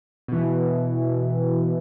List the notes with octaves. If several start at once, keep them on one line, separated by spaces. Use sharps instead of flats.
B2 E3